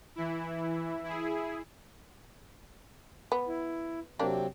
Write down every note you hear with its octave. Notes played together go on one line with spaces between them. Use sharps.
E3 E4
E4 G#4
B3
E4
C3 F#3 A#3 C4 D4 G4